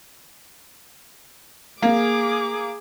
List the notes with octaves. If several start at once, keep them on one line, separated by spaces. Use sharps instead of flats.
A#3 G#4 D6